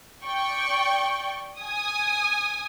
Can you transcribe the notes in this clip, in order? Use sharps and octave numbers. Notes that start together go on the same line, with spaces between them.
D5 G5 C#6
G#5 D#6